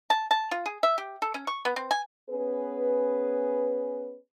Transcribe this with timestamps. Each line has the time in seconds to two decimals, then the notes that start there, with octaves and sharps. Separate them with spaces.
0.10 A5
0.31 A5
0.51 F4
0.66 G#4
0.83 E5
0.98 G4
1.22 A4
1.34 C#4
1.47 C#6
1.65 B3
1.76 C4
1.91 G#5
2.30 B3 C#4 G#4 B4